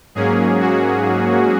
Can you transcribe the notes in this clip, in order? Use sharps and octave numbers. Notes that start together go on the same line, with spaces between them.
G#2 F#3 A#3 C#4 G#4
F#4